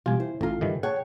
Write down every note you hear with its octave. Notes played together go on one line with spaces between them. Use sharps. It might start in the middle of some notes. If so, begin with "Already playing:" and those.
B2 E3 G3 F4 G4 G#5
E4 C5
A1 F4 A4 A#5
G2 D#3 E3
G#4 C#5 F#5 G5 A5